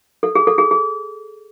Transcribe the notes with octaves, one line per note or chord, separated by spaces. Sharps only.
A4
G#4
A4
G#4
G#4